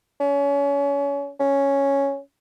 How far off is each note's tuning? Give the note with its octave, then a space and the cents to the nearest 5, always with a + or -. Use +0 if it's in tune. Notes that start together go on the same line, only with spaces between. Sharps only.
C#4 +30
C#4 +0